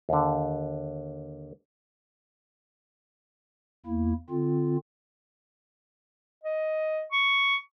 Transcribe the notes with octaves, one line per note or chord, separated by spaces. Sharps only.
D#2 D3
E2 A#3 E4
D3 C4 F4
D#5
C#6